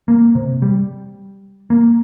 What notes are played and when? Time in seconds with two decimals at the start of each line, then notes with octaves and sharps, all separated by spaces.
0.08 A#3
0.35 C3
0.62 G3
1.70 A#3